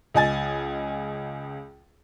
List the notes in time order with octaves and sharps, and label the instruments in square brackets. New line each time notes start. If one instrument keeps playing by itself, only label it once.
[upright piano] C#2 D#5 G#5 A6